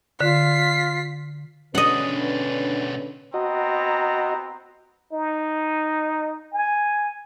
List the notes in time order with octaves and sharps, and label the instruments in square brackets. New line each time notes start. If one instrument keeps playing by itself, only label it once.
[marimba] D3 [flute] F4 [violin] B6 C7
[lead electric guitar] B2 D4 [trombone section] D3 C#4 B4 [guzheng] D#5 F#5
[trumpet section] B3 C4 A#5 [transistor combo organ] F#4 D#5
[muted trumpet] D#4
G#5